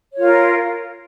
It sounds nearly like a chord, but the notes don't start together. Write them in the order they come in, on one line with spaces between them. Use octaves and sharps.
C#5 F4 A#4